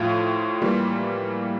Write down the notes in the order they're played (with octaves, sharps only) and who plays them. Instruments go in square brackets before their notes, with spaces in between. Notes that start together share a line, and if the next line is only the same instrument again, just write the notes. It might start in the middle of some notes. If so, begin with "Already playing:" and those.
Already playing: [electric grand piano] A2 F3 A3 [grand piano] F4
[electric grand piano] E3 G3 A#3